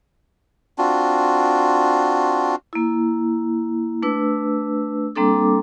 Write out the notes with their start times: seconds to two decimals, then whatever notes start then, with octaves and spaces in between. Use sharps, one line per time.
0.78 C4 D4 F4 F#4
2.73 A#3 E4
4.02 A3 D4 B4 E6
5.16 G3 A#3 C4 D4 A4 D6